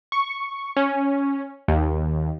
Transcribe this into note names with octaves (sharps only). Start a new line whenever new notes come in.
C#6
C#4
D#2